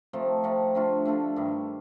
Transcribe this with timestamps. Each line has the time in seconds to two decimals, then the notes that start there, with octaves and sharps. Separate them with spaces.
0.13 C3 F3 A3 D#4
0.44 C3 F3 A3 D#4
0.75 D3 A3 D4 F4
1.05 D3 A3 D4 F4
1.36 G2 D#3 A3